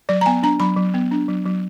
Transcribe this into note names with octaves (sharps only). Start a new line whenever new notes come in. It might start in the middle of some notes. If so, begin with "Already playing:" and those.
F#3 D5
A#5
B3 G#5
D4 A#5
F#3 B5
F#3
B3
D4
F#3
F#3